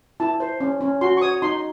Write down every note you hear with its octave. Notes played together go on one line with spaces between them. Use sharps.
E4 A5
C5
C#4
C#4
F#4 C6
C#6
C#5 D#6
D#4 C6